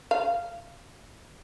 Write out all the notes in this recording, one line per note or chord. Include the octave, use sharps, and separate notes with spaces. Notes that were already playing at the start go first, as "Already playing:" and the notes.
F5